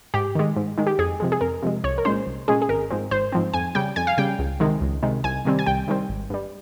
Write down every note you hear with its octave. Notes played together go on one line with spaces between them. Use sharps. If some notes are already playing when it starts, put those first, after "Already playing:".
G#2 G4
D#3 G#3
G#2
D#3 G#3
G4
F2 G#4
C3 F3 G#3
G#4
F2 A#4
C3 F3 G#3
C2 C#5
A#4
A#2 G#3 C#4 C5
C2
A#2 G#3 C#4 G#4
G#4
G#1 A#4
G#2 F3 C4
G#1 C5
G#2 F3 C4
F2 G#5
C#3 G3 G5
F2 G#5
F5
C#3 G3 G5
C#2
C3 D#3 G#3
C#2
C3 D#3 G#3
C2 G#5
C3 D#3 G3 C4
G#5
C2 G5
C3 D#3 G3 C4
G#1
G2 G3